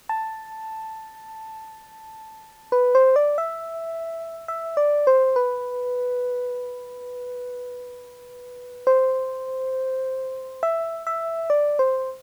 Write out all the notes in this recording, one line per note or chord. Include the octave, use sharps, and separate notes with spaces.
A5
B4
C5
D5
E5
E5
D5
C5
B4
C5
E5
E5
D5
C5